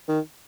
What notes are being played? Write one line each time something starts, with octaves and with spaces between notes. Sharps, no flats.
D#3